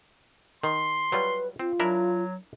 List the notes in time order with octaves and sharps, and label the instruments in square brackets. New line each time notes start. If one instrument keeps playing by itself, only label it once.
[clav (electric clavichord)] D#3 [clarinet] C6
[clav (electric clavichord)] F#3 G3 F4 [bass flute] B4
[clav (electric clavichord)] C4 [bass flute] F4
[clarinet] F#3 [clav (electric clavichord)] D4 E4 A#4